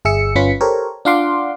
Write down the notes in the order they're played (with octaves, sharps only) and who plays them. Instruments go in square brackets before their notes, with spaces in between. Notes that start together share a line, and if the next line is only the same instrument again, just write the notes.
[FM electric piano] G1 G#4 E5 E6 C#7
G1 C#4 F4 B4 B6 C#7
G4 A4 A#4 C5 C#5
D4 F4 F5 F#5 C6 D6